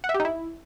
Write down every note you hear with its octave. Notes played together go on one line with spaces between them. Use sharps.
F#5
E5
G4
D#4
E4